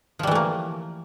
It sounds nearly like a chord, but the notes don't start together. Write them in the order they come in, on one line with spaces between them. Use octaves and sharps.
F3 G3 E3 A3 A#3